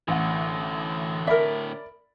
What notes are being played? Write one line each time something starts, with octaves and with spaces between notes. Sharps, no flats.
A1 D2 A2 F#5
A#4 D5 E5 B5